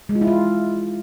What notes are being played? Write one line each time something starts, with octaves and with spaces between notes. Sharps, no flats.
G#3
F4
E4
F4